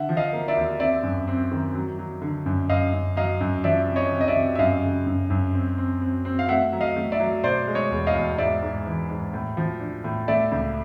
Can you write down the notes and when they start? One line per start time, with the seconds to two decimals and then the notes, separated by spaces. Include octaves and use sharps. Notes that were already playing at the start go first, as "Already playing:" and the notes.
Already playing: D3 E5 F#5
0.09 F3
0.17 D#5 F5
0.33 A#3
0.48 D5 E5
0.56 D#2
0.80 C4 D5 E5
1.03 F#2
1.27 C4
1.51 D#3
1.75 F#3
1.99 F#3
2.22 D3
2.46 F#2
2.69 F#2 D#5 F5
2.93 F#2
3.16 F#3 D#5 F5
3.41 F#2
3.64 F3 D5 E5
3.88 C3
3.96 C#5 D#5
4.12 C3
4.21 D#5
4.28 D5 E5
4.36 C3
4.55 E5
4.59 F#2 D#5 F5
4.83 C#3
5.07 F#2
5.30 F#2
5.54 C4
5.78 C4
6.02 C4
6.25 C4
6.39 F5
6.49 A3 E5 F#5
6.72 F#3
6.81 D#5 F5
6.96 A3
7.12 D5 E5
7.20 F#3
7.44 B2 C5 D5
7.67 G#3
7.75 C#5 D#5
7.91 E2
8.07 D#5 F5
8.15 E2
8.38 G#2 D5 E5
8.62 G#2
8.86 E3
9.10 G#2
9.33 A2
9.57 F3
9.80 D4
10.04 A2
10.28 A3 D5 E5
10.52 C#2